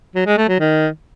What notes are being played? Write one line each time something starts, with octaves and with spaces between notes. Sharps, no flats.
F#3
G#3
A3
F#3
D#3